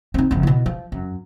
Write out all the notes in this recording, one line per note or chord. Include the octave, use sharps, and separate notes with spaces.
C4 D#4
F#1 F3
B2 E4
F3
F#2